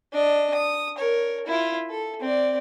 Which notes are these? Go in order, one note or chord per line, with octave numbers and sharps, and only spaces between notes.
D4 D#5
D#6
A#4 C#5
E4 F4
A4
C4 D5